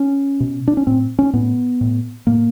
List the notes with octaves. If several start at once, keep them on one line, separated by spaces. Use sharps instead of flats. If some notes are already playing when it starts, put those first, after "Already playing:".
Already playing: C#4
B2
D4
C#4
A2 C4
C#4
A2 B3
A2
A2 A#3